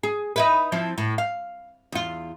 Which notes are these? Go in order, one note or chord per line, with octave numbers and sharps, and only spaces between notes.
G#4
D#4 E4 B4
F3 C4 E4
A2
F5
E2 F4